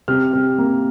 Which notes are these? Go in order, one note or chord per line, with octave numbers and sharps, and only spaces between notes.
C3 F6
C3
A#3